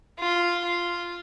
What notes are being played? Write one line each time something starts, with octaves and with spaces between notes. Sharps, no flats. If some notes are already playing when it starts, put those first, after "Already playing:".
F4
F4